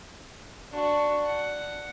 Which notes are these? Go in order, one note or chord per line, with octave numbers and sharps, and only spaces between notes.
D4 F#4
F#5